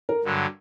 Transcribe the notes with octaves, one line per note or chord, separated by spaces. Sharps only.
A#4
G2 D3 F#3